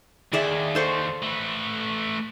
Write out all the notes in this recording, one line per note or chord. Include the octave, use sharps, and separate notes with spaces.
D#2 G#4 D5 E5
A4 C5 C#6
A3 B4